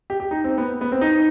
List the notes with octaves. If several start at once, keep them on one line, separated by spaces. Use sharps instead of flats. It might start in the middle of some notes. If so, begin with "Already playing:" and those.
G4
G4
D#4
C4
B3
B3
C4
D#4